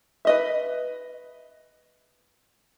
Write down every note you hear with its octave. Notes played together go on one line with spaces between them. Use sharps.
B4 D#5 E5